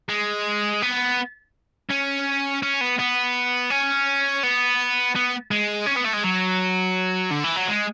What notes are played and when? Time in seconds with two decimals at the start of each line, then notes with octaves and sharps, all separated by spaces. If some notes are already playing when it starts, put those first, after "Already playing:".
0.09 G#3
0.82 B3
1.91 C#4
2.63 C#4
2.81 B3
2.99 B3
3.70 C#4
4.43 B3
5.16 B3
5.51 G#3
5.87 C#4
5.97 B3
6.05 A3
6.14 G#3
6.24 F#3
7.31 D3
7.44 E3
7.56 F#3
7.67 G#3